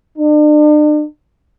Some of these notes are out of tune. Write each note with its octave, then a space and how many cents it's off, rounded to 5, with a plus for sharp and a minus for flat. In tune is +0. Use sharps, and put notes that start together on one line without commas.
D4 +40